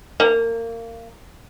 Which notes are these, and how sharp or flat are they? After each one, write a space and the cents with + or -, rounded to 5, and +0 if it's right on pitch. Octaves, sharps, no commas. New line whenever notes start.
A#3 -25